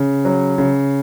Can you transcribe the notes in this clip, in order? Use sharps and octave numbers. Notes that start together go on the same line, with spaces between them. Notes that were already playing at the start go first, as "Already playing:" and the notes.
Already playing: C#3
F#3
C#3